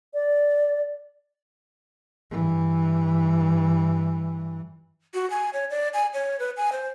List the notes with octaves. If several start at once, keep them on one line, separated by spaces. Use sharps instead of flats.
D5
G2 E3
F#4
G#5
C#5
D5
G#5
C#5
B4
G#5
C5